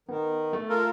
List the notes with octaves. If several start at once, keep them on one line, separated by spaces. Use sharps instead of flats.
D#3 B3
A3
F4 A4 A#4